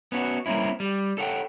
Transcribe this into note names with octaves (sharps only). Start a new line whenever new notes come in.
B3 C#4 F#4
G3 A#3 C4 C#4 E4
G3
A4 C#5 F#5 G5